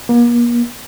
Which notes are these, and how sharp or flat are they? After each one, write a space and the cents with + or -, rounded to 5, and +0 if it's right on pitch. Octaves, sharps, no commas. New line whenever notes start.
A#3 +40